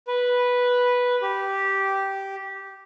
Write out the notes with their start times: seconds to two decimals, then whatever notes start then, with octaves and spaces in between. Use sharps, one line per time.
0.07 B4
1.22 G4